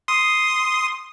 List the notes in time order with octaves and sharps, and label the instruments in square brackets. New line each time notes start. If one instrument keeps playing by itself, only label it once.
[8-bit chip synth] C6 D#6